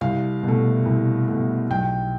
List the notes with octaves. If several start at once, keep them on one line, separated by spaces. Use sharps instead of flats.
C2 F5
B2
A3
C2
B2 A3
B1 G5